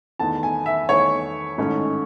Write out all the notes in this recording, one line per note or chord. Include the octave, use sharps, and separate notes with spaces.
E2 D#3 A3 A5
G#5
E5
E2 D#3 A3 C#5
A1 G#2 D#3 A3 C#4